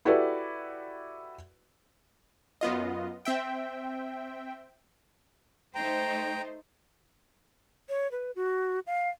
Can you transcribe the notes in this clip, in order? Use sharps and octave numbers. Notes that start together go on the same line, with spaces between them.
E4 F#4 G4 A4 B4 D5
F#2 B3 F4 D#5
C4 E5 G5
A3 D#4 C5 G5 A#5
C#5
B4
F#4
F5